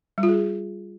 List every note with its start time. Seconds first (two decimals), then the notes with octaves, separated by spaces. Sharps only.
0.18 G3
0.23 F4
0.28 G#4